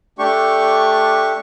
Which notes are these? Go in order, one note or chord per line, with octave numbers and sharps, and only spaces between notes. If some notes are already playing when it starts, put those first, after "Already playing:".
A3 D4 G4 C#6